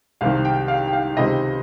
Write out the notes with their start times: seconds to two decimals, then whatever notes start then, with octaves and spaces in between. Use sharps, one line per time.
0.21 C2 C3 D#3 F5
0.45 G5
0.68 F5
0.88 G5
0.93 F5
1.17 C#2 C3 D#3 D#5